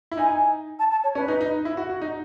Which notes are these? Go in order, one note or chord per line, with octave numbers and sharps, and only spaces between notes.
E4
D#4 G#5
A5
A5
C#5
C#4 B4
D#4
D#4
E4
F#4
F#4
D#4